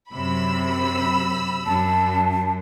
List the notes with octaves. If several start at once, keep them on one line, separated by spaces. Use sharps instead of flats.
F#2 C3 B5 E6
F#2 A5